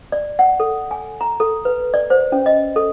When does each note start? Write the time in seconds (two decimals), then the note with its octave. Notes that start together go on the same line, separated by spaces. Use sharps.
0.12 D5
0.39 F#5
0.60 A4
0.91 G#5
1.21 A#5
1.40 A4
1.65 B4
1.94 D5
2.10 C5
2.32 C#4
2.46 D#5
2.76 A4